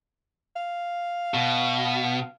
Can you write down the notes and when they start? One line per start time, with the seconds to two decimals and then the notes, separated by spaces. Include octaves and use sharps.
0.56 F5
1.34 B2